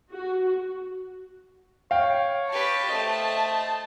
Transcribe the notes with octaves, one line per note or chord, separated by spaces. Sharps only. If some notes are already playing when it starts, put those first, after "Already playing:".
F#4
C#5 F5 G5
G4 B4 A5
A3 C5 D#5